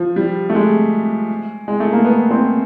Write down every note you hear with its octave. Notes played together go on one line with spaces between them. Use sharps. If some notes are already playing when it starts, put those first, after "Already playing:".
Already playing: F3
G3
A3
G#3
G#3
A3
A#3
B3
C4